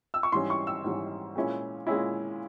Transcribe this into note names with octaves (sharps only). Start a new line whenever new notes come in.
E6
C#6
G#2 E3 G3 C#4 C6
C#6
E6
G#2 E3 G3 C#4
A#2 G#3 C#4 E4
A#2 G#3 C#4 E4